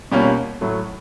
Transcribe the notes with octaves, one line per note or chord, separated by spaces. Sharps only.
B2 G3 A#3 C#4 F4
A2 F#3 A3